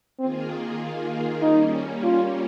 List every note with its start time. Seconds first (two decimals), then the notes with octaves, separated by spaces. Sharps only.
0.19 D#3 A#3 C4 F4 G#4
1.42 G3 A#3 C#4 D#4
2.04 F4